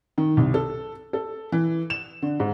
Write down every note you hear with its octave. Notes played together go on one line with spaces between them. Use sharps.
D#3
C2
A4
A4
E3
E7
D3
G#2